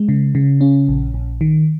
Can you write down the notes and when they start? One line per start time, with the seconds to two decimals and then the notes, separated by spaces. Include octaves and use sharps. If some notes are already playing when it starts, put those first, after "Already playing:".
Already playing: G#3
0.09 C#3
0.35 C#3
0.61 C#4
0.88 A#1
1.14 A#1
1.41 D#3